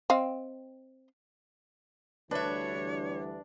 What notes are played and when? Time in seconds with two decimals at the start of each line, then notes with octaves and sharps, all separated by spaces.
0.10 C4 D#5 F5
2.31 D2 E3 G3 D4 B4 C#5 E5